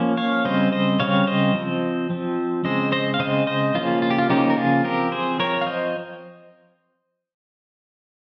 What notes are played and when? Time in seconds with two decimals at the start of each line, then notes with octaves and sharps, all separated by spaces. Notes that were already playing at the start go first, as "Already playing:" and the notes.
Already playing: F3 A#3 C#4
0.17 C#5 F5
0.45 C#3 G3 C4 C5 D#5
0.73 C5 D#5
1.00 C#3 G3 C4 C#5 F5
1.27 C5 D#5
1.55 F3 C4
2.10 F3 C4
2.64 C#3 G#3 C4 C5 D#5
2.92 C5 D#5
3.14 F5
3.19 C#3 G#3 C4 C5 D#5
3.47 C5 D#5
3.75 C#3 F3 A#3 C#4 F4
4.02 F4
4.10 G4
4.19 F4
4.29 C#3 F3 A#3 C#4 D#4 G4
4.50 A#4
4.57 F4 G#4
4.84 F3 C4 G4 A#4
5.12 G#4 C5
5.39 F3 C4 A#4 C#5
5.61 F5
5.67 C5 D#5